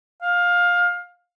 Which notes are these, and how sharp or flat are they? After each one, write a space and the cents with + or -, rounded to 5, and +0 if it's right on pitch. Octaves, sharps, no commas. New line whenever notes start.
F5 +20